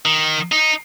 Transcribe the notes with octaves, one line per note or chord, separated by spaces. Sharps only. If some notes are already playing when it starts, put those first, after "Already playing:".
D#3
D#4